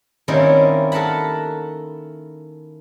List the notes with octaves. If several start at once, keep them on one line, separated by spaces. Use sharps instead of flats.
D#3 G3 A#3 C4 C#4 E4
A4 A#4 F#5 A5 B5